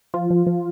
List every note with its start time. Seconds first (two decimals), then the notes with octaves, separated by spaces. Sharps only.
0.14 F3 F4
0.30 F3
0.47 F3